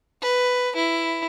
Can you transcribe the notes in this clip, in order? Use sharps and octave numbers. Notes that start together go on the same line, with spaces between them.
B4
E4